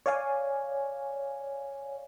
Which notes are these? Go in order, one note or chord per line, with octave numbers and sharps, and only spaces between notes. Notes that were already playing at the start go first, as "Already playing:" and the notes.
C#5 D5 F5 G#5